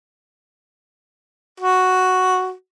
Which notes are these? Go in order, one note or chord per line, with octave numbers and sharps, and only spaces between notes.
F#4